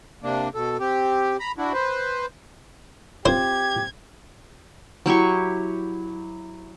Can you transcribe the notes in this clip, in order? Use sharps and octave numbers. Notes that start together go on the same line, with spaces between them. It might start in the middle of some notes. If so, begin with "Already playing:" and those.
C3 A#3 D4
B2 A4
C4 G4
A#5 B5
D4 E4 F#4
B4 C5
C4 F4 G4 C5 G#6
F#3 E4 G4 C#6